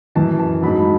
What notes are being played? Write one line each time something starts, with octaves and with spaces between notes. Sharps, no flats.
F#2 E3 A5
A5
G#2 F#3 B5